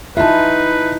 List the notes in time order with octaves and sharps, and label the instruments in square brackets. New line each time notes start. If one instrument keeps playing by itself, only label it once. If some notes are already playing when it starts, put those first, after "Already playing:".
[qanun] E3 F4 [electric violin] D#4 [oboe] B4 [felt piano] E5 A5